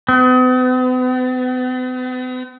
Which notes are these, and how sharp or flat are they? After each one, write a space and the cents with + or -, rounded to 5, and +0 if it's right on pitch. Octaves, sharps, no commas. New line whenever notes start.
B3 +45